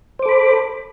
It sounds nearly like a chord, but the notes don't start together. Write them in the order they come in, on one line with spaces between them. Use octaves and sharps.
C5 D6 A4 B5